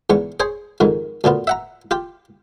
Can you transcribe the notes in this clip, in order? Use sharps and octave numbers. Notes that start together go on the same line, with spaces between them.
E2 G#2 C#6
G#4 C5 C#5
F2 G#2 D#3
D2 A#2 B3 F4
E5 F#5 A#5
F4 G4